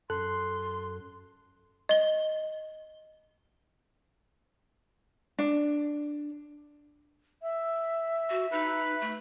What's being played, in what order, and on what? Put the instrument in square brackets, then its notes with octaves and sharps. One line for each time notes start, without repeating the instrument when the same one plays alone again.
[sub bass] F#2 [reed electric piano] A4 F#6 [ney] C6
[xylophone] D#5 G7
[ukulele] D4
[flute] E5
[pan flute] F#4
[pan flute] D#4 [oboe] B4
[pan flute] A3